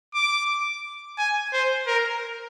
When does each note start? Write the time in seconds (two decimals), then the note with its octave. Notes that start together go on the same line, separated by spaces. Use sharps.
0.14 D6
1.18 G#5
1.53 C5
1.87 A#4